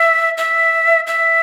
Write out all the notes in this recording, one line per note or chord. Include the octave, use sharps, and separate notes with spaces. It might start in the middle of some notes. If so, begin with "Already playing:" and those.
Already playing: E5
E5
E5